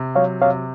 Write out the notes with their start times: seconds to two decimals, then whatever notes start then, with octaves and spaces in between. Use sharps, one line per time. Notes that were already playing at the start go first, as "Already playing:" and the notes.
Already playing: C3
0.15 F#3 C#5 F5
0.42 C3 C#5 F5